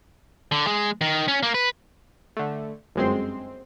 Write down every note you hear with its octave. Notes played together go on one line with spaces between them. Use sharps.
D3
G#3
D#3
C#4
A#3
B4
D3 A3
G1 F#2 G#3 C4 C6